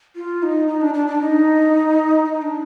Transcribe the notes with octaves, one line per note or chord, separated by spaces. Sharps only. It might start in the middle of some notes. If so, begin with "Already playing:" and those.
F4
D#4
D#4
D4
D4
D4
D#4
D#4
D4